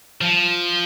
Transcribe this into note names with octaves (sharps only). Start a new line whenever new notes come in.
F3